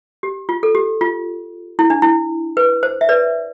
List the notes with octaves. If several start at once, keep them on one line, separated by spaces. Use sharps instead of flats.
G4
F4
A4
G4
F4
E4
D4
E4
B4
C5
E5
B4 D5